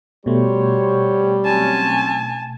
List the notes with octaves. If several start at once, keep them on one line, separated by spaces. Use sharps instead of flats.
B2 G3 A3 F#4 C5 C#5
F#3 C4 C#4 G#5 A5